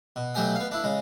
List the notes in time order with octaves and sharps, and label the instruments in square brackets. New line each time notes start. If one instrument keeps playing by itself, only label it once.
[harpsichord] B2
B2 F#3 A3 G4 G#5 D#6
B3 F5
D4 E4
C#3 G#3